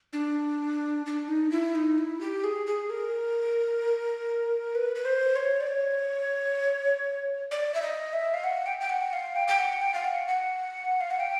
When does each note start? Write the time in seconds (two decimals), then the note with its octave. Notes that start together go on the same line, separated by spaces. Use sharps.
0.13 D4
1.06 D4
1.28 D#4
1.51 E4
1.75 D#4
1.98 E4
2.21 G4
2.44 G#4
2.66 G#4
2.90 A#4
4.75 B4
4.95 B4
5.05 C5
5.36 C#5
5.60 D5
5.67 C#5
7.51 D5
7.74 E5
7.82 D#5
8.13 E5
8.34 F5
8.44 F#5
8.66 G5
8.81 G5
8.89 F#5
9.13 F5
9.36 G5
9.48 G5
9.58 F#5
9.81 G5
9.94 F5
10.04 F#5
10.28 F#5
11.01 F5
11.11 F#5
11.20 G5